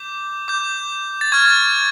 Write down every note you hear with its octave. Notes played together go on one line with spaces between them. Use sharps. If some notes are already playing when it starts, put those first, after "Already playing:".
Already playing: D6 G6
D6 G6
A6
C#6 F6 G#6